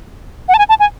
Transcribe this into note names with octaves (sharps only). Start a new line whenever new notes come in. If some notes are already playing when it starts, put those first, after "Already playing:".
F#5
A5
G#5
A5
G#5